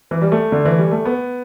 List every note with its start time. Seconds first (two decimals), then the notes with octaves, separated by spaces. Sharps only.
0.11 E3
0.21 G3
0.32 A3
0.52 D3
0.65 E3
0.79 G3
0.91 A3
1.05 B3